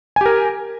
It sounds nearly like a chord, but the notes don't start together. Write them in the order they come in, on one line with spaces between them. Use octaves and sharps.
G#5 G4 A#4